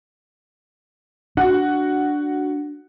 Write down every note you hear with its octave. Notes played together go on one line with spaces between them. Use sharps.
D4 F#4 F#5